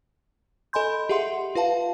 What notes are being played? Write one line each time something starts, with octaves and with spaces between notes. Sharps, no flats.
A4 D#5 G#5 B5 C6 G6
G4 G#4 E5 F#5 C6
F4 B4 F5 A5